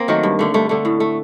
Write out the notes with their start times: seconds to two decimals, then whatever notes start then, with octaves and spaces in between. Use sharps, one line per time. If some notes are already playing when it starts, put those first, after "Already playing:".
Already playing: A#3 C4
0.08 D#3 F#3 A3
0.23 G2
0.39 D3 A3
0.54 G2 A3
0.69 D3 A3
0.85 A2
1.00 A3